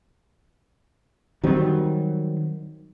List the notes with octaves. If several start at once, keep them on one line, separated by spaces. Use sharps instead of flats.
D#3 F#3 G3 C4